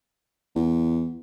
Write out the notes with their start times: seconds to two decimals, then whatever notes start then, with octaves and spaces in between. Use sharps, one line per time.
0.56 E2